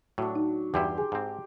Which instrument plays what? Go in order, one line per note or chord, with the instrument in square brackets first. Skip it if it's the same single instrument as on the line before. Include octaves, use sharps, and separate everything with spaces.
[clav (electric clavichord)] A2 [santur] F#3 D4
[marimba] D#4
[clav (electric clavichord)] E2 G2 E4 [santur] G4 C6
[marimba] G#4 G#5
[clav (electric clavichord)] G#2 C4